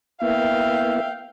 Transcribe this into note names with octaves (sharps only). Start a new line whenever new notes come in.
A#3 B3 E4 E5 F5 G5